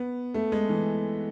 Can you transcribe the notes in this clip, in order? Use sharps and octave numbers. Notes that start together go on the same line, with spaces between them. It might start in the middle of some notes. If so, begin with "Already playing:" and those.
Already playing: B3
A3
G#3
E3